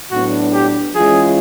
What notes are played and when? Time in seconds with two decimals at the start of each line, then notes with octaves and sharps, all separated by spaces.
0.11 A2 F#3 B3 D4 F#4
0.54 G4
0.96 E3 G#3 C#4 F4 G#4